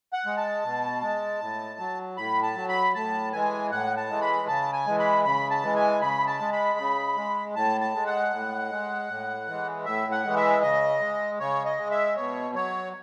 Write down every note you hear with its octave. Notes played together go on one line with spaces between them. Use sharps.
F#5
G#3
A5
B2
G#3
A2
F#3
A2 B5
A5
F#3
B5
A2 A5
E3 G#3 G#5
A2 F#5
A5
E3 G#3
B5
C#3 A5
G#5
E3 G#3
B5
C#3 B5
A5
E3 G#3
G#5
C#3 B5
A5
G#3
B5
C#3
G#3
A2 A5
A5
G#3
F#5
A2
G#3
A2
E3 G#3
A2 E5
F#5
E3 G#3
E5
C#3 D#5
G#3
C#3 C#5
D#5
G#3
E5
B2 C#5
F#3 C#5